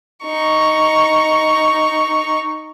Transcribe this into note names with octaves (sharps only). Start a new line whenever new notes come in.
D#4 C#6